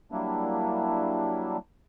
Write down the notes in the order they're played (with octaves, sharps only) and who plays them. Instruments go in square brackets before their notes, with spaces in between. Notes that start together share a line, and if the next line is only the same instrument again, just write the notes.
[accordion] F#3 G3 A#3 D4 E4